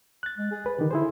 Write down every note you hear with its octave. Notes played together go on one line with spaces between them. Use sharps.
F#6 A6
G#3
G#4
B4
D3 D#3 G4
D3 E4 G#4 C5